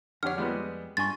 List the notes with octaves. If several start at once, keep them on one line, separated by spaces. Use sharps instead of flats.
F2 D3 G4 C#5 F#5 F6
G3 G#3 B3
G2 D4 G#5 C6 C#6 A6